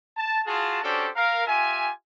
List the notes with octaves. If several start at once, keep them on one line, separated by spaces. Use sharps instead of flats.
A5
F4 F#4 G#4 A5
C#4 D4 F#4 G4 A4 C5
A#4 F5
F4 G4 E5 G#5